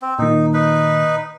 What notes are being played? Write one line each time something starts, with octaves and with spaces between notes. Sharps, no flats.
C4
A#2 D#3 D#4
D#4 B4